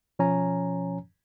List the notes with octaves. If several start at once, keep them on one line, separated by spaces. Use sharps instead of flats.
B2 F3 C#4 C#5 G#5 A#5